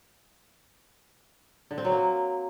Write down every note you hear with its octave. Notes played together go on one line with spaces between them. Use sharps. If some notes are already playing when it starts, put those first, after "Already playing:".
D3
C4
F#3
A#3